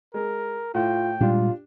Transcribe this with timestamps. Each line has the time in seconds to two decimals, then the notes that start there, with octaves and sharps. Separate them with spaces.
0.14 G#3 A#4
0.75 A2 F4 G5
1.21 A#2 G3 G#3 D4 F4 G4